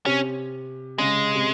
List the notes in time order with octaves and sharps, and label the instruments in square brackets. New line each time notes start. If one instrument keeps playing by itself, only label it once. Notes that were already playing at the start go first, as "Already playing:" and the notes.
[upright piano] C3 [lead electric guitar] C#4
[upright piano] C#3 [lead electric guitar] G#3
[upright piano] C3